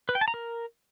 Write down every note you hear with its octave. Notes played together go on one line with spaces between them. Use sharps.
B4
G5
A5
A#5
A#4